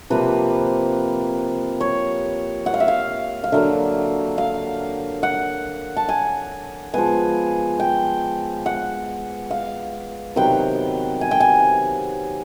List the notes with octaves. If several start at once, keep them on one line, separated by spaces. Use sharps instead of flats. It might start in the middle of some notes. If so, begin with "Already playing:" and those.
C3 F3 A#3 B4
C#5
F#5
F5
E5
F5
F5
D3 F#3 A#3 E5
F5
F#5
A5
G#5
F3 G#3 B3 G#5
G5
F#5
F5
C3 D#3 F#3 B3 G5
G#5
G5
G#5